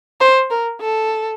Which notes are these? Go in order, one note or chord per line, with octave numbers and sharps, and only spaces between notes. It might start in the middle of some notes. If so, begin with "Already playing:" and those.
C5
A#4
A4